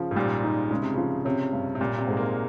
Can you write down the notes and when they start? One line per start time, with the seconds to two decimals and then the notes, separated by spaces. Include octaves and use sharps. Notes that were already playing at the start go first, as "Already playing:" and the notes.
Already playing: C#3 F3
0.11 G#2
0.16 A#2 G3
0.44 D#4
0.70 C#3 G#3
0.82 C3
0.94 C#3 F3
1.25 C3 C#4
1.53 G2
1.75 C3
1.81 A#2 G3
1.98 C3
2.07 G#2 G#3
2.17 A#3